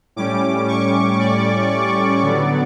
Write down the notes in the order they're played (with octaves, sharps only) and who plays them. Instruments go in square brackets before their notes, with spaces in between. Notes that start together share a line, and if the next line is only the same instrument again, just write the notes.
[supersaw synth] A2 G3 C#4 D6
C#6
D5
D5
D3 F#3 B3